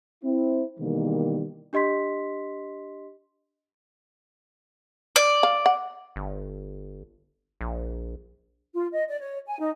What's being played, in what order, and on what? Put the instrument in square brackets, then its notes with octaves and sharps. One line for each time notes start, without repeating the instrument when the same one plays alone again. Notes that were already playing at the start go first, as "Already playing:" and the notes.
[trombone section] C4 E4
B2 D#3 E3 G3 G#3 A#3
[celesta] D4 G4 D#5 C6 B6
[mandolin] D5
[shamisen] F5
F#5
[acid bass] G1
A#1
[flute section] F4
D#5
D5
C#5
G#5
D#4